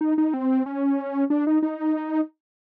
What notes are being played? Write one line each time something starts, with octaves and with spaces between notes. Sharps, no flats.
D#4
D#4
C4
C#4
D4
D#4
D#4